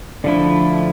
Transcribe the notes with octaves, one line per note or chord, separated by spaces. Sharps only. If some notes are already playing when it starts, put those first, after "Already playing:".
D3 F3 A3 D4 E4